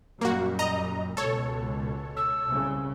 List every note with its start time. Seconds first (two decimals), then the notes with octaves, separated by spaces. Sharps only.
0.21 F#2 A#2 G3 A#3 F#4
0.59 D#5 A#5
1.17 C#2 B2 A4 C#5
2.16 E6
2.48 C2 C#3